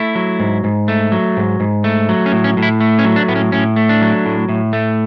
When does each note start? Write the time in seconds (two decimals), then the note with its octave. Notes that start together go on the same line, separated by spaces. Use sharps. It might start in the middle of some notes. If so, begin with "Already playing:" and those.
Already playing: A3 E4
0.15 F#3
0.40 G#2
0.64 G#2
0.88 A3
1.12 F#3
1.37 G#2
1.60 G#2
1.84 A3
2.09 F#3
2.26 C#4
2.32 A2
2.44 C#4
2.57 A2
2.63 E4
2.80 A3
2.99 C#4
3.04 F#3
3.16 D4
3.28 A2 B3
3.35 C#4
3.52 A2 C#4
3.76 A3
3.89 D4
4.02 F#3
4.26 A2
4.49 A2
4.73 A3